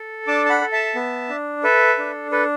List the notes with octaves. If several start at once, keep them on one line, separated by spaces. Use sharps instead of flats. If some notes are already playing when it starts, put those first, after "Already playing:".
Already playing: A4
D4 A5 D6
A5
F#5 B5
A4
E5 A5
B3
D4
A4 B4 E5
D4
A4 B4